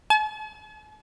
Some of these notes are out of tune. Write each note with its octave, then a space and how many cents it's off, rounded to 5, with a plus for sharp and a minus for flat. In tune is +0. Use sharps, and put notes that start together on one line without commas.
A5 -45